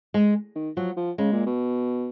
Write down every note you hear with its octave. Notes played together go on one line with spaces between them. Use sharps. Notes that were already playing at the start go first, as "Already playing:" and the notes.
G#3
D#3
F3 F#3
F3
C#3 G#3
A#2
B2